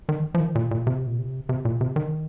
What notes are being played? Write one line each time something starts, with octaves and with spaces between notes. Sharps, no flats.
D#3
F3
D#3
A#2
A#2
C3
A#2
C3
C3
A#2
C3
D#3